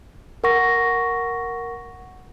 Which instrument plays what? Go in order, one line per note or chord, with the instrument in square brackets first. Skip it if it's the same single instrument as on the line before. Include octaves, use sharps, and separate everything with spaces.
[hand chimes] A#4 F#5 C#6 A#6